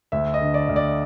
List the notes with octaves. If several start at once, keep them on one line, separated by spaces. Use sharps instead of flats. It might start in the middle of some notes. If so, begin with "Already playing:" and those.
D2 E5
D#5
D3
D5
D2
D5